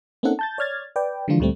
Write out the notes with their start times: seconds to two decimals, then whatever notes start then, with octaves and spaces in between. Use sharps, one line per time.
0.23 A#3 C4 C#4 D#4 A4 F#5
0.39 A5 G6 A6
0.58 C#5 D5 F6 G#6 A6
0.96 B4 D5 G5
1.28 D3 E3 F3 G#3 D4 F4
1.40 D2 A#2 G3 A3 C4